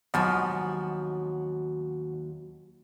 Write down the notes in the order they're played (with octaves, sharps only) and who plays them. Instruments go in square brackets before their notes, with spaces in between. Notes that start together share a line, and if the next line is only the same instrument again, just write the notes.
[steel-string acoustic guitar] D#2 F#3 F#4 [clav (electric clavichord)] G#2 B2 F3